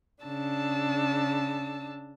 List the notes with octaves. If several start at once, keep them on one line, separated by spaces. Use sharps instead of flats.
C#3 D4 A5 E6